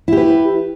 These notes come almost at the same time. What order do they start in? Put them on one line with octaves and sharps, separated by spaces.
E4 G4 B4